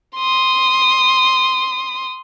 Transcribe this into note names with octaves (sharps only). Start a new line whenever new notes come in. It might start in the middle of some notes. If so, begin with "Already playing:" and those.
C6 D#6